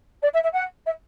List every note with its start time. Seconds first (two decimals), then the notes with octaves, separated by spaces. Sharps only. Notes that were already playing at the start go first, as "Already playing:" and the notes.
0.22 D5
0.33 E5
0.43 E5
0.53 F#5
0.85 E5